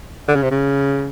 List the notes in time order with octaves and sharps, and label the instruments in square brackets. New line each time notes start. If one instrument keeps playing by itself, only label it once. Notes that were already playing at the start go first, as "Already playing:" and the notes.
[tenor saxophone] D3
C#3
C3
C#3